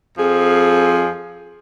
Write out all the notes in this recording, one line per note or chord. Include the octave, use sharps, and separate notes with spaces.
F2 F3 G#4